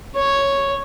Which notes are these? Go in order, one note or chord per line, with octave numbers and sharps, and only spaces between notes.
C#5